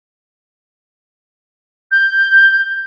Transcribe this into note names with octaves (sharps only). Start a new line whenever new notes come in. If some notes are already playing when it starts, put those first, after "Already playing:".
G6